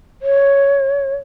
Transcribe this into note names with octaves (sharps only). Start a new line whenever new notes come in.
C#5